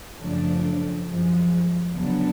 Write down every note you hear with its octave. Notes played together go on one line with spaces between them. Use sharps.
F#2 C#3 F3 A3 D4
F#2 F3 G#3
D2 C#3 F#3 B3 D4